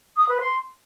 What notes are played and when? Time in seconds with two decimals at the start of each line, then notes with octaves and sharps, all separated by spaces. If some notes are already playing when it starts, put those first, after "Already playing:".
0.16 D#6
0.28 B4
0.40 C6